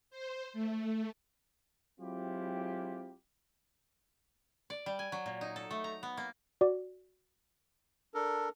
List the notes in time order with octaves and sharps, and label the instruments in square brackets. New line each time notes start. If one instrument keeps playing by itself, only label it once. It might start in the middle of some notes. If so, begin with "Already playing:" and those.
[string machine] C5
A3
[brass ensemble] F#3 G#3 C4 E4 F4 G4
[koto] D5
G3
G#5
F#3
A#2
D#4
A4
A3
A#5
B3
A#3
[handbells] F#4 D5 D6
[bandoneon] D4 A4 A#4